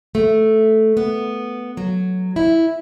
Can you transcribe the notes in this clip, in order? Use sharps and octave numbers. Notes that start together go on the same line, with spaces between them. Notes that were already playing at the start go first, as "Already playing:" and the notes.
A3
B3
F#3
E4